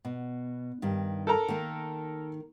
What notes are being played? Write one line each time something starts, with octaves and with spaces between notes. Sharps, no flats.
B2
G2 D#3
A4 A#4 A#5
D#3 A#3